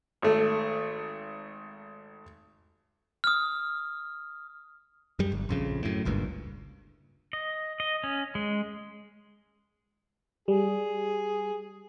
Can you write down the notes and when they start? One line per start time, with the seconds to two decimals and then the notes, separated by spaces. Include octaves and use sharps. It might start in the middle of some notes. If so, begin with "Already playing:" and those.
0.22 G#1 A3
3.24 D#6 F6
5.19 F#2 G3
5.32 G1
5.49 A#1 F2 C#3
5.83 F#2 A2
6.05 F#1 C#2 G2 A#2
7.33 D#5
7.80 D#5
8.04 C#4
8.35 G#3
10.48 G3 G#4